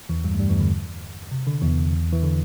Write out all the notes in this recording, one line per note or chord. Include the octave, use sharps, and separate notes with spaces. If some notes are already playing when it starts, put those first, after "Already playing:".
E2 E3
G2 G3
A3
G2 G3
E2 E3
D3
C3
D3
E2 E3
E3
D3